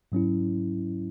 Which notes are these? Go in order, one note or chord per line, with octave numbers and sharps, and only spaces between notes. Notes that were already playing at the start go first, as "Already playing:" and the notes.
G#2 F#3 C#4 E4